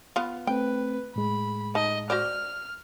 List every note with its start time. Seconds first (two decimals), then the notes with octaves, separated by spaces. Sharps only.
0.16 B3 F4
0.47 A3 C4 B4 G5
1.16 A2 G#3 B5
1.75 D#4 D#5 A5
2.10 F#4 C5 D5 F6